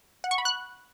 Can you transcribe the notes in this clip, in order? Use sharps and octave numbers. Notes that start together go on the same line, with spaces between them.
F#5
C#6
B5
F#6